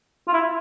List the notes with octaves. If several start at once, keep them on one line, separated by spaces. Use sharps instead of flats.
F4
E4